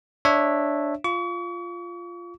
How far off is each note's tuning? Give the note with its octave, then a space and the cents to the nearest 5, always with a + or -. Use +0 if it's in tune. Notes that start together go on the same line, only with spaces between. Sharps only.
D4 +0 C#5 -15 E5 +0
F4 -5 C#6 +40